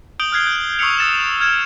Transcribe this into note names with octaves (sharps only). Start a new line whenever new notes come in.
D#6 G6 D7 F#7 G7
D#6 F6 F#6 G#6 C7 G7
G6
C#6 D#6 E6 C7 C#7 F7
D#6 E6 A6 C#7 E7
F6 G#6 E7 G7